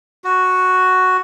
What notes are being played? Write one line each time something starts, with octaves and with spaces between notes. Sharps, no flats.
F#4